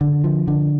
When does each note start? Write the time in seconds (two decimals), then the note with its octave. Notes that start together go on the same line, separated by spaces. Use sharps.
0.01 D3
0.24 F3
0.48 D3